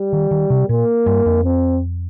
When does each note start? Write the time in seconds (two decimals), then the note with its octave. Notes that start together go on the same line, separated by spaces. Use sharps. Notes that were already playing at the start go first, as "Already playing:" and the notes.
Already playing: G3
0.13 D#3
0.31 D#3
0.50 C3
0.69 A#2 A#3
1.06 G2
1.26 F2
1.45 C4